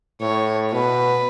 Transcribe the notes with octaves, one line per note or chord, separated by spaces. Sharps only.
A2 C#5
B2 B4